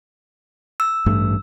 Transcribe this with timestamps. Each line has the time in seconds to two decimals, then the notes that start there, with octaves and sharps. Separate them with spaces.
0.80 E6
1.06 A1 G2 A3